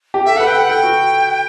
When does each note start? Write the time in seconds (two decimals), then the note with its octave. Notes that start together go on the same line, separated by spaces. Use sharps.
0.14 G4
0.25 A4 E5
0.36 A4 B4 F#5
0.47 G5
0.55 B4 F#5
0.69 A4 G5
0.83 F#4